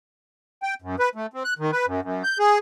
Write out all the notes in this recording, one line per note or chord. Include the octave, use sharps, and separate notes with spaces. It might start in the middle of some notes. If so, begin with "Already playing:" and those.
G5
F#2
B4
A3
C4
F#6
D#3
B4
F#2
F#2
G6
G#4